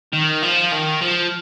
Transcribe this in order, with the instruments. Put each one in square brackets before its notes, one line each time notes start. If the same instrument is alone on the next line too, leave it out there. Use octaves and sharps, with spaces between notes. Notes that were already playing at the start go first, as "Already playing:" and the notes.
[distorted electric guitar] D#3
F3
D#3
F3